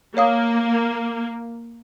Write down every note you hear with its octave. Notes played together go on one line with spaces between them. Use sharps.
A#3 C#5 F5 D#6